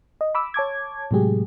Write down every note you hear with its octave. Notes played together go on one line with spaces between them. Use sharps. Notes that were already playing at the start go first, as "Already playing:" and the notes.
D#5
B5 D6 E6
C#5 A5 D6 G#6
A2 C3 F#3 G#3 G4 G#4